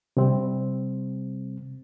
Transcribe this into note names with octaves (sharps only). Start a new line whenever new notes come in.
C3 G3 C4